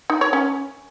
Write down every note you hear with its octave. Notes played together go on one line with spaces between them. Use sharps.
D#4
C#5
C#4